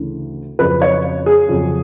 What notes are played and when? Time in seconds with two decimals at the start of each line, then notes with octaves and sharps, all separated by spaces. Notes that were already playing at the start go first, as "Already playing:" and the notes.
Already playing: D2 C#3 E3
0.59 F2 C#3 F#3 B4
0.82 C#5
1.26 G#4
1.49 F2 C#3 F#3